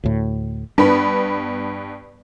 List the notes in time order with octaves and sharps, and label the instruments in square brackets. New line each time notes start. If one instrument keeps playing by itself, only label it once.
[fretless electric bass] D2 A2
[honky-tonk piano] G2 B3 B5 [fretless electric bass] D4